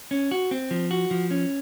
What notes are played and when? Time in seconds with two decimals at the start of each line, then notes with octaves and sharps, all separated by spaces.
0.11 C#4
0.31 F#4
0.51 C4
0.71 F3
0.91 F#4
1.11 F3
1.31 C#4